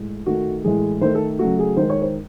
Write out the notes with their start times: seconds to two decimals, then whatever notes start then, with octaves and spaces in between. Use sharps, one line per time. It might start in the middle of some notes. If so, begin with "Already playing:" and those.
Already playing: A2 G#3
0.26 D#3 A3 F#4
0.64 A2 E3 G#3 G#4
1.01 D#3 A3 C5
1.15 A4
1.39 C#3 F#3 A3 F#4
1.59 G#4
1.77 D#3 G#3 C5
1.90 C#5
2.02 C5